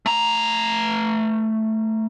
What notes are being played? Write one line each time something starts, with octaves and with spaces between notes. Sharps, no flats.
A3 A#5